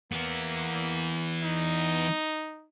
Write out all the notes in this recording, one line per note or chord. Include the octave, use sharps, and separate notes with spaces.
E3 A#3 B3
D#4